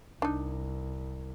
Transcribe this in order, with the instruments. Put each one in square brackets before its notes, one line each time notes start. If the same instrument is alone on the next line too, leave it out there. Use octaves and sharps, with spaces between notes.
[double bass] C2 [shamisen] D4 D#4